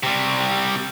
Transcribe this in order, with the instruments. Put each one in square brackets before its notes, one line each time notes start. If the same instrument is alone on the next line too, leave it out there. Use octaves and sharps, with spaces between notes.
[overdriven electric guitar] C3 G3